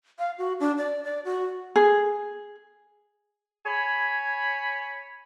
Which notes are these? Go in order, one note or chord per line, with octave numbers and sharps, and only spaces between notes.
F5
F#4
D4
D5
D5
F#4
G#4
C#5 G#5 B5